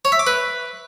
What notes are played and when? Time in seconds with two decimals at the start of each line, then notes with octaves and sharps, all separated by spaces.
0.05 C#5
0.12 E5
0.19 D6
0.27 B4